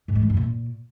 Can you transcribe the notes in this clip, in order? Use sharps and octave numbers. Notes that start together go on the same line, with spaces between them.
G#2
G#3
E3
G2
A#2